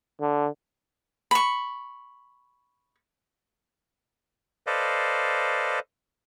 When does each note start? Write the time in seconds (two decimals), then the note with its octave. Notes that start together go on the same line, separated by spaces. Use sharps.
0.21 D3
1.31 B5 C#6
4.67 A4 B4 C5 D5 D#5 F5